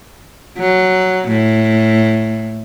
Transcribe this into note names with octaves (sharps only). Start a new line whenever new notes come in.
F#3
A2